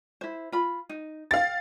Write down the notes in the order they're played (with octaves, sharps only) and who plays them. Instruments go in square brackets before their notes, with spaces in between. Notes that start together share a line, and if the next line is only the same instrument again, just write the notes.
[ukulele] E4 C5
F4 B5
D#4
[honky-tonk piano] F5 A6 [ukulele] G5